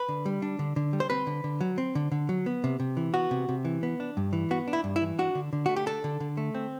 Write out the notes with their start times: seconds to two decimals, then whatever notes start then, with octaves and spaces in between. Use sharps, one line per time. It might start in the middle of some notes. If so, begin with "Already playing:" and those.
Already playing: B4
0.09 D3
0.26 G3
0.42 D4
0.59 D3
0.76 D3
0.93 G3
1.00 C5
1.10 C4 B4
1.27 D3
1.44 D3
1.61 F#3
1.78 C4
1.95 D3
2.12 D3
2.29 F#3
2.46 B3
2.64 C3
2.80 C3
2.97 E3
3.14 B3 F#4
3.31 C3
3.49 C3
3.65 E3
3.83 B3
4.00 D4
4.17 G2
4.33 E3
4.51 B3 F#4
4.68 D4
4.73 E4
4.84 G2
4.96 E4
5.02 E3
5.19 D4 F#4
5.35 D3
5.53 D3
5.66 A3 F#4
5.76 G4
5.86 D4 A4
6.04 D3
6.20 D3
6.37 A3
6.55 C4